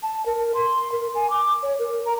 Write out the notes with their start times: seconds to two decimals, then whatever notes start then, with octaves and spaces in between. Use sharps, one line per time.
0.03 A5
0.26 A#4
0.54 C6
0.92 A#4
1.15 G#5
1.30 D6
1.63 C#5
1.79 A#4
2.06 A#5